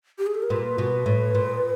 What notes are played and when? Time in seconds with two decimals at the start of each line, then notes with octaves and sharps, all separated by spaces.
0.18 G4
0.27 G#4
0.35 A4
0.42 A#4
0.50 A#2 B4
0.78 B2
1.06 A2
1.35 A#2